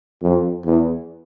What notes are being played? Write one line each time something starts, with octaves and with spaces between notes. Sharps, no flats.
F2
E2